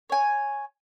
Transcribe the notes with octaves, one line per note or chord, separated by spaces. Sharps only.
C#5 G#5